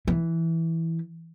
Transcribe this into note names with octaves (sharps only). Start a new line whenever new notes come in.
E3